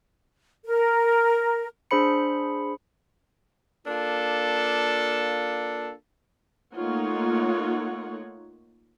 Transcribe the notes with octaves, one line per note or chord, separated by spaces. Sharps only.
A#4
D4 G#4 C5 B5 C#7
A#3 D4 F4 A4
A3 A#3 D#4 F4 C#5 F#5